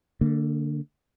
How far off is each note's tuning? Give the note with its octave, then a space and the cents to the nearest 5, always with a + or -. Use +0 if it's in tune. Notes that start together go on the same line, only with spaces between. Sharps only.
D3 +0 A#3 -35